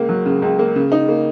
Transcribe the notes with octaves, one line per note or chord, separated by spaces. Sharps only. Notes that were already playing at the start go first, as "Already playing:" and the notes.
Already playing: C#2 A#3
F#3
C#3
C#2
A#3
C#3
D#4
A#3